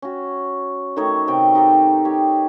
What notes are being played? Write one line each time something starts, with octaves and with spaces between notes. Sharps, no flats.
C#4 F#4
D#3 A3 D#4 C#5
C3 F#3 G5
D#4 G4 A4
G4 C#5